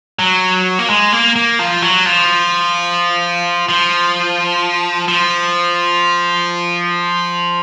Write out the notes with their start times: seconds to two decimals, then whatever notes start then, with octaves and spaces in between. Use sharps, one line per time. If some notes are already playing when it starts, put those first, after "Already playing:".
0.19 F#3
0.79 A#3
0.90 G#3
1.12 A#3
1.36 A#3
1.59 F3
1.82 F#3
2.06 F3
3.69 F3
5.08 F3